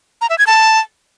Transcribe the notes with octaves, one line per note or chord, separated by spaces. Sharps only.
A#5
E5
G#6
A5